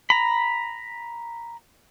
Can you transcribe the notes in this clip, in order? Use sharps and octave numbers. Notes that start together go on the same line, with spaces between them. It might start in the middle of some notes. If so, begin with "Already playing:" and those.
A#5 B5